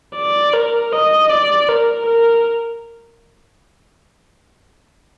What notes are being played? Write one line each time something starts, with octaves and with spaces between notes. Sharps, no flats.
D5
A#4
D#5
D5
A#4
A#4